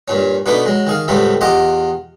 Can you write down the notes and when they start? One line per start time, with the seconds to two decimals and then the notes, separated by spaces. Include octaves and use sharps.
0.08 G2 A#2 C#4
0.46 B2 A3 B3 D4 D#4 B4
0.65 F#3 G#3
0.87 D#3 G#4 F5
1.08 C#2 A2 G3 A3 B3 C4
1.41 E2 F4 G4 D#5 F#5